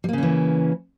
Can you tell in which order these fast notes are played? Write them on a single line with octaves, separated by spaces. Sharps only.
G3 A#3 C#3 C#4 E3